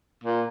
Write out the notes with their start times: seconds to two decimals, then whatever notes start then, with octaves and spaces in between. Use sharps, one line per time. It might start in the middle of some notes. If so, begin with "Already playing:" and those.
0.24 A#2